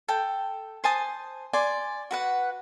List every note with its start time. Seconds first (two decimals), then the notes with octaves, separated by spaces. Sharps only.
0.08 A4 G5
0.84 C5 G#5 A5 D#6
1.53 D5 G#5 C6
2.11 F#4 B4 F#5